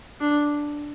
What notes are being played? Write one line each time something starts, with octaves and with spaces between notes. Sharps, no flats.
D4